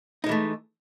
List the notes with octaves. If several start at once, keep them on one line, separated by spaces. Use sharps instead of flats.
E3 G#3 A3 D#4